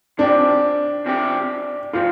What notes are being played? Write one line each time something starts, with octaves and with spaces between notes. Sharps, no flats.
C3 F3 C4 D4 G4
C3 F3 C4 G4
C3 F3 C4 F4